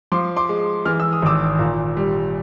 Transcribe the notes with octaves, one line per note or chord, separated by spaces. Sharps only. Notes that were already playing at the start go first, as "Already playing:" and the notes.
F3 C6 D6
C6 D6
G#3
E3 F6
E6
D#6
G#1 D6 E6
A#2
G3